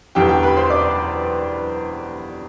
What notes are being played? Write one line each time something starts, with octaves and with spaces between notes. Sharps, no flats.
E1 E2 D3 G4 G5
G4 G5
B4 B5
C5 C6
D5 D6